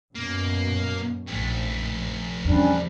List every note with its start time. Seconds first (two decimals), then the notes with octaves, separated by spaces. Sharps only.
0.15 F#2 B2 A#3
1.27 A#1 F2 A3
2.45 E2 C3 G3 C#4 D4